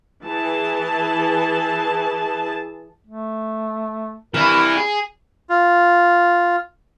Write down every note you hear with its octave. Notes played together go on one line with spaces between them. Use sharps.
E3 G#4 A5
A3
G2 C3 E3 E4 A#4
G#4
F4